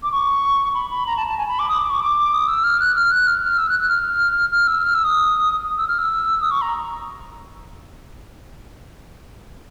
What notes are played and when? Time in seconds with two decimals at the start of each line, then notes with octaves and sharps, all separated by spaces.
0.03 D6
0.12 C#6
0.74 B5
0.90 B5
1.07 A#5
1.17 A5
1.27 A5
1.38 G#5
1.48 B5
1.59 D6
1.69 D#6
1.80 D6
1.90 C#6
2.01 D6
2.33 D#6
2.47 E6
2.64 F6
2.80 F#6
2.95 F6
3.11 F#6
3.27 F6
3.42 F6
3.57 E6
3.69 F#6
3.80 F#6
3.89 F6
4.52 F6
4.67 E6
4.83 F6
4.94 E6
5.04 D#6
5.78 E6
5.88 F6
5.98 E6
6.41 D#6
6.51 C#6
6.62 A#5